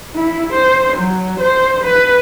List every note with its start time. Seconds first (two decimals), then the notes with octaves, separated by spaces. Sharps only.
0.15 E4
0.53 C5
0.97 F#3
1.40 C5
1.84 B4